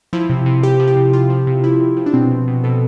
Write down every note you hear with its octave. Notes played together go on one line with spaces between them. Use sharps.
F3 E4
C3
C3
C3 G4
F3
G4
C3
C3 F4
F3
C3
F3 E4
C3
F3
D4
B2 C4
B2
B2
B2 A4